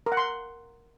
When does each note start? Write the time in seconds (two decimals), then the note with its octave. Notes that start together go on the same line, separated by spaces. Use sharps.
0.06 A#4
0.12 F#5
0.17 C6